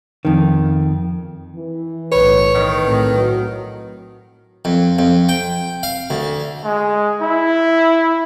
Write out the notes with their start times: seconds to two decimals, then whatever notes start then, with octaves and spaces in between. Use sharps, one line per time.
0.25 F2 D#3
1.55 E3
2.12 B1 A2 B4 C#5
2.54 D#3
2.83 A2 C4
3.16 F#3
4.65 F2
4.99 F2
5.29 G5
5.83 F5
6.10 D2
6.64 G#3
7.22 E4